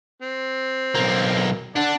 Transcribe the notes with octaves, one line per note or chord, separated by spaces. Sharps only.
C4
B1 A#3
D4 D5 F#5 A5